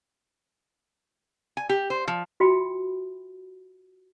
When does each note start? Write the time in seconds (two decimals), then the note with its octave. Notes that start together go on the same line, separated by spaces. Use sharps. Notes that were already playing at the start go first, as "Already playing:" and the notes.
1.57 G#5
1.69 G4
1.90 C5
2.08 F3
2.40 F4 F#4 E5 G5 B5